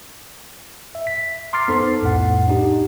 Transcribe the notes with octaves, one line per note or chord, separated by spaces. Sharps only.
E5
B6
A#5 C6 D6 F6 A6 C7
B3 D#4 A4 C5
C2 F2 A2 F#5
D4 D#4 G4